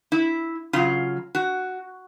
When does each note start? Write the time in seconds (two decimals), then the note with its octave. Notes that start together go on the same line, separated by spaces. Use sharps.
0.12 E4
0.73 C#3 F#3 F4
1.35 F#4